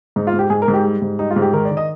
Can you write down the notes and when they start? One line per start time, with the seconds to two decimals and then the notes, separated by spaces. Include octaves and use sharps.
0.16 G#2 D#4
0.27 F4
0.34 G#2
0.39 G4
0.50 G#2 G#4
0.62 A#4
0.68 G#2
0.74 G4
0.84 G3
1.02 G#2
1.19 G3 D#4
1.30 F4
1.36 G#2
1.42 G4
1.53 D#3 A#4
1.65 D5
1.71 D#3
1.77 D#5